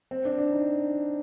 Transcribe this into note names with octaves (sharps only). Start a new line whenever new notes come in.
C4
D4
D4
D#4